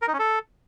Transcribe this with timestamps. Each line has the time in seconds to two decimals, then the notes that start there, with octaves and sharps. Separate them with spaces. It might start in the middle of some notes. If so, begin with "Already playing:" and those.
0.02 A#4
0.08 D#4
0.13 C#4
0.19 A4